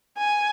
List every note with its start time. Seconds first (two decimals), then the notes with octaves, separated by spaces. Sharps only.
0.18 G#5